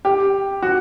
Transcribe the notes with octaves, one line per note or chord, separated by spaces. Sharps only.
G4
F#4